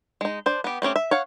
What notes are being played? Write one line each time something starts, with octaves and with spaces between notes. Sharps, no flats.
G#3 D#4
D4 C5
B3 G4
A3 C4 C#4 G4
E5
C#5 F5 F#5